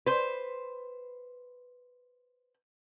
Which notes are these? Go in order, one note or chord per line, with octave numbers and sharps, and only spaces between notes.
B4 C5